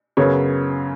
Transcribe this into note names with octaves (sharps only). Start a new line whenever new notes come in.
F#2 C#3 F#3 B3 C#5